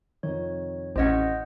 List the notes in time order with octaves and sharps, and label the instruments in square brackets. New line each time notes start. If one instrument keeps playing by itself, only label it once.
[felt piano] F2 C3 D#3 [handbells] C#5
[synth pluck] A1 C#4 [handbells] C5 D#5 F#5